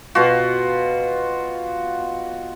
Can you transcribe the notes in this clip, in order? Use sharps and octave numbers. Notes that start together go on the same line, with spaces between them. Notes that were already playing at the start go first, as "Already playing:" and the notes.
B2 F4 F#4